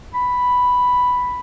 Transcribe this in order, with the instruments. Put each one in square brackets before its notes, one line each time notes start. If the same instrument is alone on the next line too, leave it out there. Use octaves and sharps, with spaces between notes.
[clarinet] B5